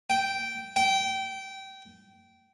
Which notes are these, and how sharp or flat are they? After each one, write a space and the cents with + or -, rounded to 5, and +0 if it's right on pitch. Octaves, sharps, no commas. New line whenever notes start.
G5 -10
G5 -20